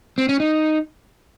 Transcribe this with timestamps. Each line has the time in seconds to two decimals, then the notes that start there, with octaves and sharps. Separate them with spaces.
0.18 C4
0.29 C#4
0.40 D#4